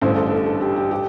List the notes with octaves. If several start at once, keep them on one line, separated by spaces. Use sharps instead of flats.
A1 G2 D3 C5
A4
A4
A4
G4
G4
G4